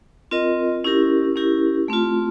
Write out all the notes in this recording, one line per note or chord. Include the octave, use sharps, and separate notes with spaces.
C4 F4 A#4 D#5
C#4 E4 G4 A#4
C#4 E4 G4 A#4
A3 C4 F4